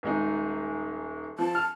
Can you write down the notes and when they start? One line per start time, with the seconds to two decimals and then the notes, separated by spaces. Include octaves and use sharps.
0.03 D#1 G#3 D#4
1.39 F3 A5
1.55 F6